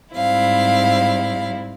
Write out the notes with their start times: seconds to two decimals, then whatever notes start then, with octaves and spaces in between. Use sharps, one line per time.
0.15 G#2 G3 C4 E4 F5